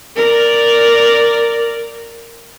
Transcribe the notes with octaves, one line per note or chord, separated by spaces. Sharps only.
A#4 D5